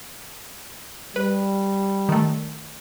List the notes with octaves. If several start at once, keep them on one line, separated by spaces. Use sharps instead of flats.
G3 B4
D#3 A3